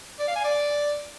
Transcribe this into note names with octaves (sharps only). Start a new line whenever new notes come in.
D5
F5
G#5
D5